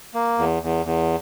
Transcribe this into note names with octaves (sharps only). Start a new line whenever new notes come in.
A#3
E2
E2
E2